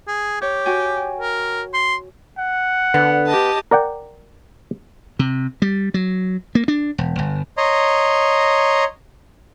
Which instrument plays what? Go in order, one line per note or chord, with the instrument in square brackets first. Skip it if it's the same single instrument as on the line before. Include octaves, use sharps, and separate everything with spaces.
[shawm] G#4
[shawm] G4 [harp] C#5
[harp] F#4 G5 G#5
[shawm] A#4
C6
[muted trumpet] F#5
[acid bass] D3 [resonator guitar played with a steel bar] B3
[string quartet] G4 D#5 A5
[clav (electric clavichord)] A#4 D5 F#5 G5
[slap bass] C3
G3
F#3
A#3
D4
E1
G1
[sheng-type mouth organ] C#5 D#5 A#5 C6